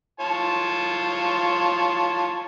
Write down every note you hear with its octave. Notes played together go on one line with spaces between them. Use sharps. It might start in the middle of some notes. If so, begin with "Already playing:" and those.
F4 C#5 A5